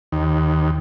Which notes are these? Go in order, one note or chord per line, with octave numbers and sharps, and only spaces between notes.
D#2